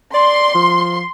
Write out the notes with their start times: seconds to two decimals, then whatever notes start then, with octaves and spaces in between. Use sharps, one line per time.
0.14 D5 C6
0.54 F3